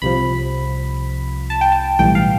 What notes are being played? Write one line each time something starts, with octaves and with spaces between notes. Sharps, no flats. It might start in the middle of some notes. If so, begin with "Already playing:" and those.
C2 C3 F3 B5
A5
G5
A5
B1 A2 E3 G3 G5
F5